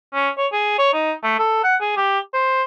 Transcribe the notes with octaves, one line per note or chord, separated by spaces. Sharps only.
C#4
C#5
G#4
C#5
D#4
A3
A4
F#5
G#4
G4
C5